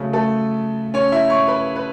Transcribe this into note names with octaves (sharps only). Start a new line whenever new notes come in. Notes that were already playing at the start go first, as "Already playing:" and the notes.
Already playing: C#3 F#3 A3
A3 A4
C#4 C#5
E4 E5
C#5 C#6
B4 B5
B4 B5